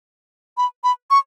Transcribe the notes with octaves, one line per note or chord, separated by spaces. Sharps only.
B5
B5
C#6